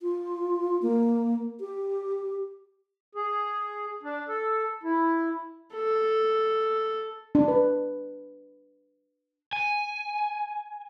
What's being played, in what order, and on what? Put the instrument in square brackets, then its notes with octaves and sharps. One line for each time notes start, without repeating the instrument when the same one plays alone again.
[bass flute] F4
A#3
G4
[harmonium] G#4
D4
A4
E4
[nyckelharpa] A4
[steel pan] D4
B4
[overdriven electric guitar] G#5